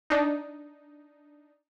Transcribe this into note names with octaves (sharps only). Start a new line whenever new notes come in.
D4 D#4